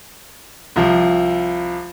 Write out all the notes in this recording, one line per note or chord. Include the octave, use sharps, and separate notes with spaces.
C2 F3